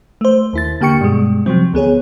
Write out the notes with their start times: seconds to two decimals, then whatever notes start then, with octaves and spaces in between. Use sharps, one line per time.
0.21 A3 C5
0.53 D#2 E4 A6
0.81 D3 A#3 G4 G5 C#6 C#7
1.01 G2 B2 G#3
1.46 C3 F3 F#3 C4
1.73 D2 B3 G#4 C#5